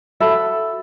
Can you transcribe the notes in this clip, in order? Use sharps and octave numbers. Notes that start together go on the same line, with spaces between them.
F#4 A4 E5 B5